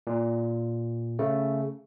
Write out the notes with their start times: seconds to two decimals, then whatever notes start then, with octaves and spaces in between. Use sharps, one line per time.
0.07 A#2
1.19 C#3 A3